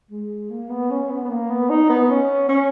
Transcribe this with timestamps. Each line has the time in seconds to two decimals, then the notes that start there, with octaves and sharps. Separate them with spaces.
0.11 G#3
0.50 A#3
0.70 B3
0.90 C#4
1.10 B3
1.25 B3
1.30 A#3
1.50 B3
1.70 D#4
1.89 B3
2.10 C#4
2.49 C#4